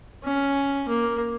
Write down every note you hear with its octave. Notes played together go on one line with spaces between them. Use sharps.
C#4
A#3